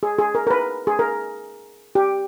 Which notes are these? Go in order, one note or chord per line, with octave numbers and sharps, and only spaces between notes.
G#4
G#4
A#4
A#4
B4
G#4
A#4
G4